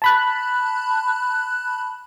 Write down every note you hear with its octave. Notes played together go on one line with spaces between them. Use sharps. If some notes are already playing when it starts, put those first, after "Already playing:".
A5 B5 F#6